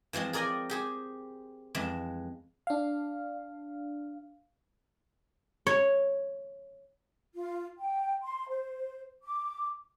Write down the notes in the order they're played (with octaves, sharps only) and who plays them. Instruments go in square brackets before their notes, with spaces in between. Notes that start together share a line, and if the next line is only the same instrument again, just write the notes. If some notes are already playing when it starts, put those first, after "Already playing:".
[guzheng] E3 F3 G#3 C4
G#4 A#4 D5 D#5 G5 G#5
G4 G#4 C5
F2 E3 G#3 E5
[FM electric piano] D4 F5
[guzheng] C#5
[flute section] F4
G5
C6
C5
D6